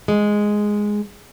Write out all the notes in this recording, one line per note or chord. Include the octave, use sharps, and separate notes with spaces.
G#3